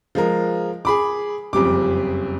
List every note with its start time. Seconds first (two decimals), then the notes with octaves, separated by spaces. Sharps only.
0.15 F3 G#3 A#4
0.85 G#4 B5 D6
1.53 F#1 F2 G3 D6